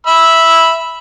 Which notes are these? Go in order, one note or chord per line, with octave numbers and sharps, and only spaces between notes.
E5 B5 E6